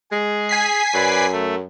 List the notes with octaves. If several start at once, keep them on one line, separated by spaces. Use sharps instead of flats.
G#3 G#4
G#5 B6 C7
F#2 B4 D5
A3